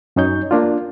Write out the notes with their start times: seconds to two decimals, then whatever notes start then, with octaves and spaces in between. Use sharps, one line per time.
0.16 F#2 F#3 C#4 D#4 C#5 G6
0.51 A#3 D4 F4